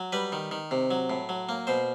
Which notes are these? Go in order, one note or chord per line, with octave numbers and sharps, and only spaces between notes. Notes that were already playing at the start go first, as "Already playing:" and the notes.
Already playing: F#3
G3 B4
D#3
D#3
C3
F#3
A2
F#3
A#3
B2 C5